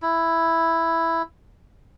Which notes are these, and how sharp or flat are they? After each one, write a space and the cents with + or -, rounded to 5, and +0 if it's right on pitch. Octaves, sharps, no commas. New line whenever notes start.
E4 +0